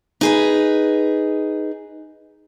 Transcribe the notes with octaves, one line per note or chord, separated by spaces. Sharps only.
D#4 G#4 B4